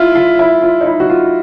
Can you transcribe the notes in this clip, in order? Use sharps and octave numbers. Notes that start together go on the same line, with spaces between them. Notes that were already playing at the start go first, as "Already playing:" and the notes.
Already playing: E4 F4
F4
E4
F4
D#4
E4
F#4
F4